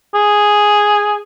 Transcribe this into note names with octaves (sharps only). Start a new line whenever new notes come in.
G#4